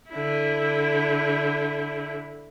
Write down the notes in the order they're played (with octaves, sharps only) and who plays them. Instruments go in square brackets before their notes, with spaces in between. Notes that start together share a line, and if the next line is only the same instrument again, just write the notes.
[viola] D3 E4